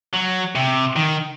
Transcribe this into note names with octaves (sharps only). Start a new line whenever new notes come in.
F#3
C3
D#3